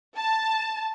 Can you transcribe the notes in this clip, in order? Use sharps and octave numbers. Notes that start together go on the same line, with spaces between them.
A5